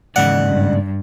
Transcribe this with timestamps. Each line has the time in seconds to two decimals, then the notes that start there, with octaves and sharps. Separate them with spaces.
0.16 D#2 G#2 C#3 E3 D5 F#5
0.47 G2